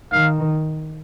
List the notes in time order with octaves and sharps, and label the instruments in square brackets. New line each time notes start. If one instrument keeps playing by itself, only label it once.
[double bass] D#3 [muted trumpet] F5